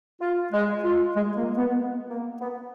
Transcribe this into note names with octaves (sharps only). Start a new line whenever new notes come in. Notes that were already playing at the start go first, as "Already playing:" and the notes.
F4
G#3
F4
G#3
A#3
B3
A#3
B3